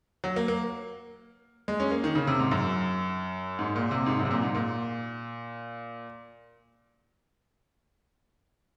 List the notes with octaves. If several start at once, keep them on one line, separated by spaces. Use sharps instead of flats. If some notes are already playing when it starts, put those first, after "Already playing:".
F#3
A#3
A#3
G#3
C#4
A#3
D#3
C#3
C3
G#2
F#2
G#2
A#2
C3
G#2
F#2
C3
A#2
G#2
A#2